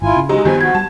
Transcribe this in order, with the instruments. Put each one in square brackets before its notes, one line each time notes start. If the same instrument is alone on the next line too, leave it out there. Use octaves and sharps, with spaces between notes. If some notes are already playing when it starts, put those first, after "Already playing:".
[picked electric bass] G#1 [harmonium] E4 F4 G#5
[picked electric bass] C#3
[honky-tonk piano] F#3 D#4 [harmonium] G#3 [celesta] G4
[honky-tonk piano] G2 F3 G3 [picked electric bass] D#3 B3 [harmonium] G#5
[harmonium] F#4 [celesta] G#6
[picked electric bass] G3 [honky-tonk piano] A5